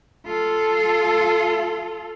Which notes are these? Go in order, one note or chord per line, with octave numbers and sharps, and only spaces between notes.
F4 A4